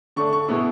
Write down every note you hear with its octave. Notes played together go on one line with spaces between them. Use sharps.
D3 A3 D4 C#6
C#6
B2 G#3 B3 E4 C#6